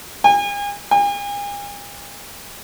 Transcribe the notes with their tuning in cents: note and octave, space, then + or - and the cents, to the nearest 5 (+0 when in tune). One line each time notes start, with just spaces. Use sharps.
G#5 -35
G#5 -40